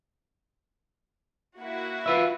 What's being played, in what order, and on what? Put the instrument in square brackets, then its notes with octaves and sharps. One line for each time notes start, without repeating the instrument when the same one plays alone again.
[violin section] A#3 E4 F#4
[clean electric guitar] F4 B4 E5